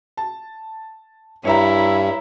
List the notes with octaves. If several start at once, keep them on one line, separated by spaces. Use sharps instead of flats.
A5
G2 E4 C#5 E5 A#5